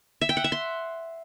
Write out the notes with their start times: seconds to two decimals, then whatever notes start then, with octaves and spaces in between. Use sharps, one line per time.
0.21 E5
0.29 G5
0.37 F#5
0.44 E5
0.52 C6